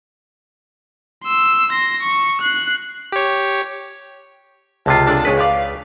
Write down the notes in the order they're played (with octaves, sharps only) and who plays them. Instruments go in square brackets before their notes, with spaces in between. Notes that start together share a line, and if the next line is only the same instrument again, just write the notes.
[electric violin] C6 E6
C6 A#6
C#6
F#6 C7
[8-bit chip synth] G4 C#5
[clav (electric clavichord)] C#2 C3 F4 [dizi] A5
[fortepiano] G#3 D4 A4
[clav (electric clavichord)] C#2 B4 [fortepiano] G#3 C#4 G#4
[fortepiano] C#3 D5 [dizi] F5